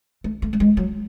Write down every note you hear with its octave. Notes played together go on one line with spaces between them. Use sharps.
A3
A3
A3
G#3
F#3